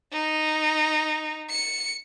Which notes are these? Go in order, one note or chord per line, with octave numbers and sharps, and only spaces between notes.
D#4
C#7